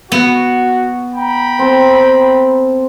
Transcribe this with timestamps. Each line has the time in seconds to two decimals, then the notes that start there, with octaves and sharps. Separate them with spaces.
0.12 B3 F#4
1.14 G5 A#5 B5
1.59 C4 A4